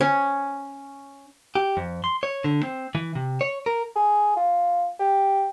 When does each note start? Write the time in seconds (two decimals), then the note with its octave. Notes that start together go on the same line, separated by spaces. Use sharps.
0.01 C#4
1.55 G4
1.77 F2
2.04 C6
2.23 C#5
2.44 D3
2.63 C4
2.95 E3
3.15 C3
3.41 C#5
3.66 A#4
3.96 G#4
4.36 F4
5.00 G4